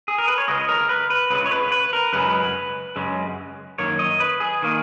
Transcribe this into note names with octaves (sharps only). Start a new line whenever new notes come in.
G#4
A#4
B4
C#5
C#2 C#3 G#3 D#5
A#4
B4
B4
C#2 C#3 G#3 B4
C#5
B4
B4
A#4
F#2 C#3 G#3 B4
F#2 C#3 G#3
F#2 D#3 A#3 C#5
D#5
B4
G#4
D#3 A#3